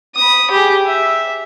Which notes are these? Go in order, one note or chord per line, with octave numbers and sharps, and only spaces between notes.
B5 D#6
G4 G#4
E5